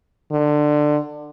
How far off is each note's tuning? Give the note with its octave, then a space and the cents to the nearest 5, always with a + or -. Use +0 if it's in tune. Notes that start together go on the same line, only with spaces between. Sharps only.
D3 +20